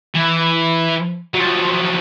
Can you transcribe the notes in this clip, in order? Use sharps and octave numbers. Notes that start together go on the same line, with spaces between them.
E3
F3 F#3